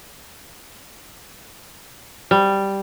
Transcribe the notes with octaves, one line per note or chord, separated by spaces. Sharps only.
G3